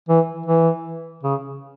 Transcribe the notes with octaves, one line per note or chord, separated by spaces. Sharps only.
E3
E3
C#3